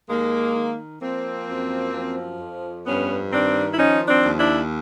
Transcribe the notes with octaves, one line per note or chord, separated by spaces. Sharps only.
D#2 G#3 A#3
D#3
F3 A#3 C4
F#2
F3
F2
G2 B3 C#4
D#3 C4 D4
E4
F3 C#4 D#4
C4 D4
D#2
D4 E4